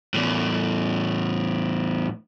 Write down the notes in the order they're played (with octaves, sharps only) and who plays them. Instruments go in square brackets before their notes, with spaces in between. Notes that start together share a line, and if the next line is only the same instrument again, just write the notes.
[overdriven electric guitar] E2 A2